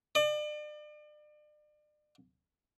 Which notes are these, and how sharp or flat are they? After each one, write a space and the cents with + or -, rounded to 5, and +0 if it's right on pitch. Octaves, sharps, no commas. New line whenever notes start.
D5 +40